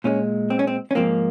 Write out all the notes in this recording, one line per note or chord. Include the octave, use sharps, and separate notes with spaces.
A#2 G#3 C#4
C4
C#4
C4
C#4
G#2 F3 A#3 C4